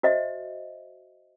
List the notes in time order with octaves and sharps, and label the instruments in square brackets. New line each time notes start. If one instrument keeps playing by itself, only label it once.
[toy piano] F#4 C5 D#5 E5